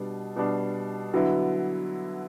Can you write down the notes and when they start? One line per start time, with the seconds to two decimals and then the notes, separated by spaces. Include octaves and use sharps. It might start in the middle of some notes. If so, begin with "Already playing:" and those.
Already playing: B2 G3 D4
0.36 B2 G3 D4
1.13 D3 F#3 B3 E4